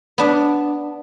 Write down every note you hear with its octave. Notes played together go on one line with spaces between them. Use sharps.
B3 D4